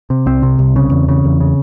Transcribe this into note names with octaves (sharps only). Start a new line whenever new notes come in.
C3
C2 C4
C3
C2
C#3
E2
C#3
E2
C#3